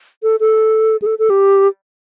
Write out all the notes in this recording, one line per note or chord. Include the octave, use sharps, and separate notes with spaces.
A4
A4
G#4
A4
A4
G4